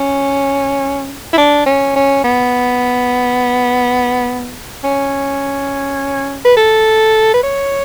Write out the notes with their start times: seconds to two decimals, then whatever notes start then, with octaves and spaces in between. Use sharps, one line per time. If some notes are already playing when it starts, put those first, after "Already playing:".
Already playing: C#4
1.33 E4
1.38 D4
1.66 C#4
1.96 C#4
2.24 B3
4.84 C#4
6.45 B4
6.57 A4
7.34 B4
7.43 C#5